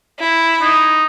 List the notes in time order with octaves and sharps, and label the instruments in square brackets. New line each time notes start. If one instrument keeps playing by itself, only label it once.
[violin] E4
[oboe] D#4